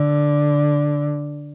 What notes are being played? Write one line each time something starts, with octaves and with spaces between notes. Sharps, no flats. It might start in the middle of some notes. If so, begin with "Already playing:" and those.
Already playing: D3